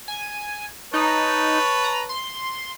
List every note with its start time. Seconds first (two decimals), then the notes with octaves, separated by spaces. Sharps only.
0.08 G#5
0.94 D#4 B4 C#5 A5
1.84 A#5
2.09 C6